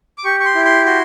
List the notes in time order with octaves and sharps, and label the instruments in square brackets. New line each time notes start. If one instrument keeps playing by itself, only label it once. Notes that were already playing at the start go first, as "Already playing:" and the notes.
[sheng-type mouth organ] D6
G4 C#6
C#6
C6
E4
C6
F#4 C6